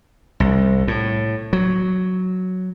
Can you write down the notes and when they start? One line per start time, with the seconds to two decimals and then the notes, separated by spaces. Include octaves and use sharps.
0.40 C2
0.88 A2
1.53 F#3